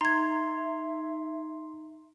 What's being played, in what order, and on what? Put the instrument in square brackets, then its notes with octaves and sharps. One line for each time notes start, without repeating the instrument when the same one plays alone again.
[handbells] D#4 [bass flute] E5 [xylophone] A#5 G#6 [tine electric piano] C6